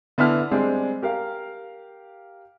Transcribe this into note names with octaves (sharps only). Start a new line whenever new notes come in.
D3 B3 E4 E5 A5 F6
G3 G#3 C4 D4
G4 A#4 F5